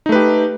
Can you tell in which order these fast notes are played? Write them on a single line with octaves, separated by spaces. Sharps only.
D#4 A3 B4 G4